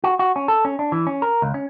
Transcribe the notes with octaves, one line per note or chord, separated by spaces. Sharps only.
F#4
F#4
C#4
A4
C#4
D4
E3
C#4
A#4
C#2
C#4